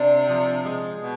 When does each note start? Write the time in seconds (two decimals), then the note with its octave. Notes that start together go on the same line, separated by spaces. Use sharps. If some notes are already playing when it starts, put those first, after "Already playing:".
Already playing: C3 D4
0.29 F3
0.65 G#3
1.00 B2